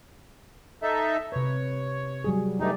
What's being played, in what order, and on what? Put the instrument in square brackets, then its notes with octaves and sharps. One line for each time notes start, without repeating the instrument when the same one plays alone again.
[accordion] D#4 A4 E5
[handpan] C3 B4 [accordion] C#5
[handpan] F#3 G3 G#4
[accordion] G2 A3 D#4 [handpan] G4 D5